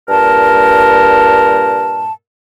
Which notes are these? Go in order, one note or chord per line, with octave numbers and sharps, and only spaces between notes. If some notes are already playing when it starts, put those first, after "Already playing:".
G2 A#2 A#4 A5